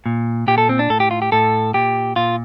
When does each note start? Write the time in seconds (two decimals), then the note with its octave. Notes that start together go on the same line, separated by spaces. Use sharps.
0.06 A#2
0.48 A#2 G4
0.58 A4
0.69 C4
0.79 D4
0.90 A2 A4
1.00 G4
1.11 F4
1.22 G4
1.32 A2 A4
1.74 A#2 G4
2.16 A#2 F4